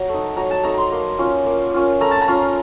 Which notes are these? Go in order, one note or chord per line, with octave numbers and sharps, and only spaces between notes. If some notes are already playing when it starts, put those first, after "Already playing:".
Already playing: F#3 A#5
A3 D#4
F#3 A#5
A5
A3 D#4 A#5
A#5 C6
A#3
C#4 F4
A#3
C#4 F4
A3 A#5
A5
A#5
C#4 F4